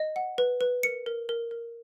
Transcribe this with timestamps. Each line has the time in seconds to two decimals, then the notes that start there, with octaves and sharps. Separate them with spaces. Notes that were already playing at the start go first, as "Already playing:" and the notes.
Already playing: D#5
0.16 F#5
0.38 B4
0.61 B4
0.83 A#4 C#7
1.06 A#4
1.29 A#4
1.51 A#4